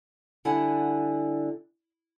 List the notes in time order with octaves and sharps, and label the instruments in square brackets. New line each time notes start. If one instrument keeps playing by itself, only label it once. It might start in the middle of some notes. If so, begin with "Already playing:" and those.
[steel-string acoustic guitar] D3 G3 E4 F#5 G#5 A5